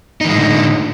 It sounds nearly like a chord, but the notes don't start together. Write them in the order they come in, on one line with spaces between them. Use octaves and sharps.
D#4 E3 G#3 A2 D3